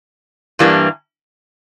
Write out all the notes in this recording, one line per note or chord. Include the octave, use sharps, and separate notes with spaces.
G2 E3 G3 A#3 D4